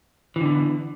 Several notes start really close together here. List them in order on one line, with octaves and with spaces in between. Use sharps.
E3 D3 B3